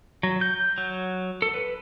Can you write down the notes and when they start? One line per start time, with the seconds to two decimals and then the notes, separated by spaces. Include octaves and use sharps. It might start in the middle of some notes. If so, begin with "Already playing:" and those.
0.23 F#3
0.41 G6
0.78 F#3
1.42 A4
1.54 B4